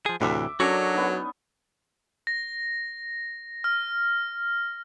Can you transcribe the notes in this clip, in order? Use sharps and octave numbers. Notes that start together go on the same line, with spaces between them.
F3 G#4
D2 A2 C3 E3 E5 D6
F#3 C#4 D4 F#4 A4 A#4
B3 D#4
A#6
F6